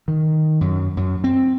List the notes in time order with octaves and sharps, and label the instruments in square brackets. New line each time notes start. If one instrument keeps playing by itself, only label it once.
[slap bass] D#3
F#2
F#2
C4